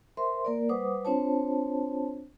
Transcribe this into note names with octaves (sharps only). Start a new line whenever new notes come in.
A#4 C5 E5 C6
A#3 A#4 D5
G3 B4 C5 F#5 D6 D#6
C4 D4 F4 C5 C#5 A5